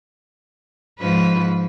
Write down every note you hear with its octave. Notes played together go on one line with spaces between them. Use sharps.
G#2 F3 B4